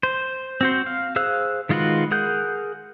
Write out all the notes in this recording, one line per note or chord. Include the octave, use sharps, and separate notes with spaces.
C5
C4 F#4 C5
F5
G#4 C5 F5 E6 F#6
D#3 G#3 F4 F#4 B4
G#4 A#4 F#5 F#6 G6